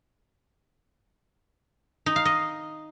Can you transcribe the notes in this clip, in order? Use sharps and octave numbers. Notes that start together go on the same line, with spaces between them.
D#4
F5
D#5